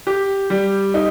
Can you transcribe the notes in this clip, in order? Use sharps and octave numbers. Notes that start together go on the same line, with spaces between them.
G4
G3
D#4